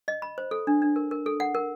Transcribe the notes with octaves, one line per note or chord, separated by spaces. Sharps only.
D#5
B5
C5
A4
D4
D4
A#4
A#4
A4
F#5
A#4